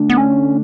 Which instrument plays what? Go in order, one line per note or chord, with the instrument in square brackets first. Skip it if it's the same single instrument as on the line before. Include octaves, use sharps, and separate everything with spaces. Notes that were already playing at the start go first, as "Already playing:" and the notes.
Already playing: [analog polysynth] D3 A3 D4
[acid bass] B3
C#4